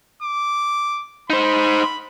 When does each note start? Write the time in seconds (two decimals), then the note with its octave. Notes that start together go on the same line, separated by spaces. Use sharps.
0.22 D6
1.30 D#4 C5 B5